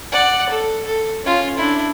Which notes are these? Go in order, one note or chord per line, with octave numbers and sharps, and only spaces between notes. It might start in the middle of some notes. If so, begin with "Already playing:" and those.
D5 F#5
A4
A4
C#4 F4
D4 E4